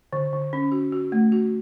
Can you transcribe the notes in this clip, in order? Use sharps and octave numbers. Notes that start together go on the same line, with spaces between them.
D3
D3
C#4
F#4
F#4
A3
F#4